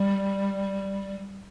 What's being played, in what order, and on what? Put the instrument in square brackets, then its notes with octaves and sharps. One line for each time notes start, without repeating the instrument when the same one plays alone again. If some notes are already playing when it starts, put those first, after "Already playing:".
Already playing: [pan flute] G3